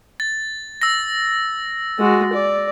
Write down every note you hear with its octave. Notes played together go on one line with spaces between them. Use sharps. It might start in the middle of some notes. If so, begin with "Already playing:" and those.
A6
E6 A#6
G#3 F#4
D5